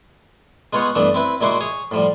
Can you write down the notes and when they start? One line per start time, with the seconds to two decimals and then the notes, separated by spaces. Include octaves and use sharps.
0.73 G#3 B3 F4 C#5 F#5
0.95 G2 E3 A3 B3 D4
1.14 C4 E4 B4
1.41 A#2 G#3 E4 F#4 C6 D6
1.61 G#4 C#5
1.91 A2 F3 G3